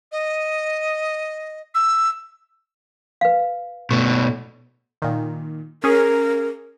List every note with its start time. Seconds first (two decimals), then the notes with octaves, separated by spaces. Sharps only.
0.12 D#5
1.75 E6
3.21 B4 F5
3.91 B2 A3 C#6
5.02 A#2 D#3
5.84 C#4 G#4 A#4